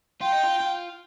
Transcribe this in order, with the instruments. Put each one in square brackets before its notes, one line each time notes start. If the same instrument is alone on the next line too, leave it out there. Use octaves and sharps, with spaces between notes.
[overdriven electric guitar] F4 [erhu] G5
[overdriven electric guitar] D#4
F4
F4